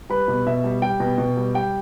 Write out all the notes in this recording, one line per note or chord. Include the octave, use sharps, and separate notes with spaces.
G3 B4
B2
B2 E5
G3
G3 G5
B2
B2
G3
G3 G5